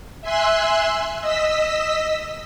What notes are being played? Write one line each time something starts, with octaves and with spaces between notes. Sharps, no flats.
E5 G#5 C6 E6 F#6
D#5 E6 B6